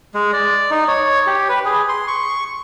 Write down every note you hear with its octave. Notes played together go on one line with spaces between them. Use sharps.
G#3
D5
D#4
C#5
G4
B4
G#4
C6
C#6